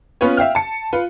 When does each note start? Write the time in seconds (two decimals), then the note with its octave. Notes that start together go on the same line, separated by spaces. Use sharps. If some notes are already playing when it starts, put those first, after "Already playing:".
0.21 B3 C#4 F4 B4 C#5
0.37 E5 F5 G5 F6
0.55 A5 C#7
0.93 F4 B4